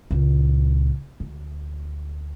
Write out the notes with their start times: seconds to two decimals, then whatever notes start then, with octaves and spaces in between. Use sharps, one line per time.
0.11 C#2 A#2
1.20 D2